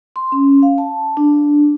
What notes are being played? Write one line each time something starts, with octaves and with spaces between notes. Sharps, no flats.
C6
C#4
F5
A5
D4